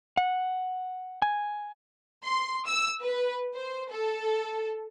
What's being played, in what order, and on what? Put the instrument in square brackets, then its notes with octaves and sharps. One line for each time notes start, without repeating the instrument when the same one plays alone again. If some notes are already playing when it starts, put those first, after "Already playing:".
[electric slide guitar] F#5
G#5
[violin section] C6
E6
B4
C5
A4